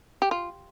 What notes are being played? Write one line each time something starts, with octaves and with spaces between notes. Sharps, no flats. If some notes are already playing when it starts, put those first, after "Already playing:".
G4
F4